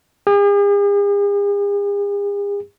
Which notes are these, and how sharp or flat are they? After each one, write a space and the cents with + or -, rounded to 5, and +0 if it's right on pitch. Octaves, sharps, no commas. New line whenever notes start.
G#4 -45